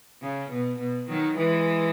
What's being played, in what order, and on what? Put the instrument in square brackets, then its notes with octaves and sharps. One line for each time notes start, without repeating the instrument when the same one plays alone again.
[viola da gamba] C#3
B2
B2
D#3 F#3
E3 G#3